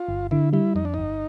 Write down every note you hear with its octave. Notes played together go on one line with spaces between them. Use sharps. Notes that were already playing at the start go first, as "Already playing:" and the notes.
Already playing: F4
G1
D3 E4
G3 E4
F2 D#4
D4
G1 D#4